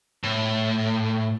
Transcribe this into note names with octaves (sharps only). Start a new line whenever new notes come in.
A2